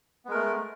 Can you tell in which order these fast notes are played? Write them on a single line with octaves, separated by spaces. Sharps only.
B3 G#3 A#4 A3